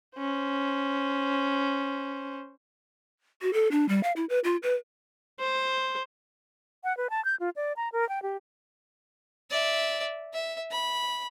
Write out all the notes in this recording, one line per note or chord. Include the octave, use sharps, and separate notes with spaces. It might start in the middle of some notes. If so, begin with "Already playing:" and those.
C#4 C5
F#4
A4
D4
G3
F5
E4
B4
F4
B4
C5
F#5
B4
A5
G6
F4
D5
A#5
A#4
G5
G4
D5 E5
E5
B5